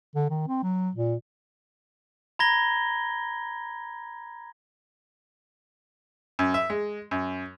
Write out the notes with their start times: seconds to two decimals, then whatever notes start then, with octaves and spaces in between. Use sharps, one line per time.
0.15 D3
0.30 D#3
0.48 C4
0.63 F#3
0.95 A#2
2.39 A#5 B5 G#6 A#6 G7
6.39 F#2
6.54 E5
6.70 G#3
7.11 F#2